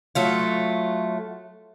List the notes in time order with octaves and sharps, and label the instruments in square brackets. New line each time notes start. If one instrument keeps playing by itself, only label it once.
[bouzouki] F#3 A3 F4